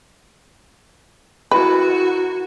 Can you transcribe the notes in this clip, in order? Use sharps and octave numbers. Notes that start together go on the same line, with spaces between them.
E4 F#4 A#4 B4